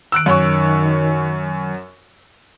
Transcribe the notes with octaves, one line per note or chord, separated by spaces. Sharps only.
D#3 E6 F#6 D7
F#2 C#5 C#6